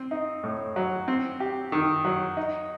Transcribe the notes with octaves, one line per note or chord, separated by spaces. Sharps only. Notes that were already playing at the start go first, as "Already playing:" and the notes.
Already playing: C4
D#4
A2
F#3
C4
G4
D#3
F#3
D#4